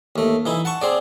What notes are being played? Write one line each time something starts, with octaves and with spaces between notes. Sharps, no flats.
D#2 A3
E3 D#4 E4
F#5 A5 C#6
C4 G#4 D5